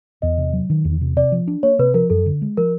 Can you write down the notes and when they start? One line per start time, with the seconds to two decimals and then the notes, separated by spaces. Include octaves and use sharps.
0.22 E2 D#5
0.38 C3
0.53 F#3
0.70 D#3
0.85 E2
1.01 C3
1.16 C3 D5
1.32 F3
1.47 D4
1.63 A#3 C#5
1.79 C3 B4
1.94 F3 A#4
2.10 F#2 A4
2.26 D3
2.42 G#3
2.57 F3 A#4